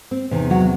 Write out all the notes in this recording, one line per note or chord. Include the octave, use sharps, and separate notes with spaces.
C4
E2 C3 D#3
F#3 F#4